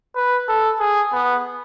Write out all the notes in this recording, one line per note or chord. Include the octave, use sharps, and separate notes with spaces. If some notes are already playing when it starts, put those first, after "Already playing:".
B4
A4
G#4
B3